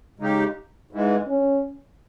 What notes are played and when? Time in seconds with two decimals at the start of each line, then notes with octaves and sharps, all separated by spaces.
0.19 C#3 G#3 D#4 G4
0.91 G#2 E3 G#3
1.27 C#4